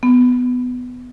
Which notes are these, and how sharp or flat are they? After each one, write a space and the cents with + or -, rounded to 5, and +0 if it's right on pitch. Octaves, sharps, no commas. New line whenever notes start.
B3 +10